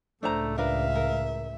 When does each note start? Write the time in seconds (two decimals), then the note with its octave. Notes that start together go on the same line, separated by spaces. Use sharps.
0.23 C#2 A2 A3 D4 C5 A#5
0.58 D4 A#4 B4 E5 F5
0.96 A#4